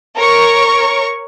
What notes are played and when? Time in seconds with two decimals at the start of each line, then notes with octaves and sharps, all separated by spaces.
0.17 A#4 C#5 C#6